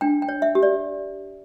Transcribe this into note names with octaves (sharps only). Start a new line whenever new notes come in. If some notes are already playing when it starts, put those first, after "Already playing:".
D4 G5
G5
C#5
E5
G4
D5